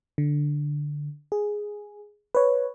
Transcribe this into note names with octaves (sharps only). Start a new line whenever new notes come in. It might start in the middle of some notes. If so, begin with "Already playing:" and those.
D3
G#4
B4 C#5